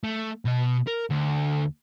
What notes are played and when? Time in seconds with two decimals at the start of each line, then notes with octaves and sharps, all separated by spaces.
0.04 A3
0.45 B2 D#5
0.87 A#4
1.11 D2